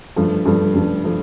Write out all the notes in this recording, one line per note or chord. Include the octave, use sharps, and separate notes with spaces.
G2 F3 A3
G2 F3 A3
G2 F3 A3
F3 A3